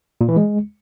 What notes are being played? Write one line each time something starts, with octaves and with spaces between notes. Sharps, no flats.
A#2
E3
G#3